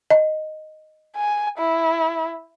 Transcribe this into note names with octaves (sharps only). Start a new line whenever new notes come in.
D#5
G#5
E4